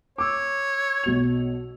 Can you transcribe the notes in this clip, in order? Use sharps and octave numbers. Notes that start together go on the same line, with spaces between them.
C#5 D6 E6
B1 B2 F7